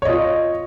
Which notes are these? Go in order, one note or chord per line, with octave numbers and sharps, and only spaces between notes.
F4 C#5 D#5